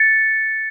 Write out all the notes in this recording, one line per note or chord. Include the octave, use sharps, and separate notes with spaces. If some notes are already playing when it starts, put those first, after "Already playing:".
Already playing: A6 C#7